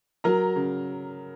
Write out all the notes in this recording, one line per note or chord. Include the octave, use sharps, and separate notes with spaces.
F#3 A#4 A#5
C#3